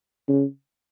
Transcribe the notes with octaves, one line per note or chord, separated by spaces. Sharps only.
C#3